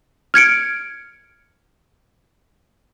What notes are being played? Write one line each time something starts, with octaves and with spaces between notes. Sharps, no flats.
F6 G#6 C#7 D7